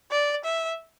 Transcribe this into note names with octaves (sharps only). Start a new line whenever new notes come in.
D5
E5